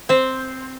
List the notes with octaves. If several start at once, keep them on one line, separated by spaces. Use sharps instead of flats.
C4 C5